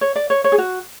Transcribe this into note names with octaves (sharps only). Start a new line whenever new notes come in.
C#5
D5
C#5
C#5
G#4
F#4